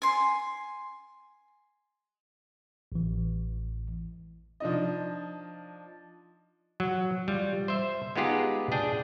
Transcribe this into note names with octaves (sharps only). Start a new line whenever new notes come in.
G#5 C6
A1 E3
F3 D4 D#4 D#5
F#3
G3 F4
C5 E5
G#3 B3 D#4 F4 G4 G#4
D4 G#4 G5